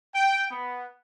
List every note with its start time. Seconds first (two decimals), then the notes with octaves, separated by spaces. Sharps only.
0.15 G5
0.51 B3